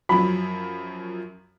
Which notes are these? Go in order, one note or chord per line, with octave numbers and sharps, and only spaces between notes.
F#2 F3 F#3 B5